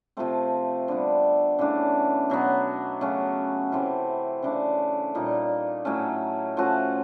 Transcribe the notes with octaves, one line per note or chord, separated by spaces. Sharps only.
C3 F3 A3 C4
D3 G3 B3
C#3 E3 A3 D4
B2 F#3 B3
C#3 F#3 A3 C#4
C3 E3 A3 C4
C#3 E3 A3 D4
A#2 G3 A#3 D#4
A2 F#3 A3 C#4
F3 A3 C#4 F#4